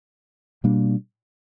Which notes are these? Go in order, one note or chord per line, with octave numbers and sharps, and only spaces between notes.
B2 G3 A#3 D4